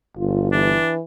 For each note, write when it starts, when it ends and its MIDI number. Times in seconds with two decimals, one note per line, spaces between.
0.18 0.76 31
0.18 0.48 65
0.52 1.01 52
0.52 0.92 62